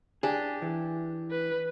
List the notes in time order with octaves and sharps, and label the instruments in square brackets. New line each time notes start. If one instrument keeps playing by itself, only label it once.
[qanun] D4 G4 [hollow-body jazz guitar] G#4
[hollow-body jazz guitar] E3
[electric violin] B4